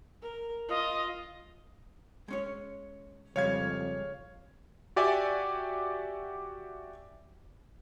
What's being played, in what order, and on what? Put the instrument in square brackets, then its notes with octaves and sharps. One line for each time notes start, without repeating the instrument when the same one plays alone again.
[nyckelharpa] A#4
[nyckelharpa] F4 [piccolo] D#5
[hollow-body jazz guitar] G#3 C#4 C#5
[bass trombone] F2 [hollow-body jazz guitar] C#3 G3 G#3 [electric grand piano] C#5 F5 G#6
[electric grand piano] F#4 G4 D5 E5 G#5